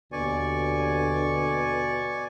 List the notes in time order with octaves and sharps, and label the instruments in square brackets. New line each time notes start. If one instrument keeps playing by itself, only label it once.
[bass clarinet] D#2 [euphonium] B2 [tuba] D3 [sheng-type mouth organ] D5 G#5 C#6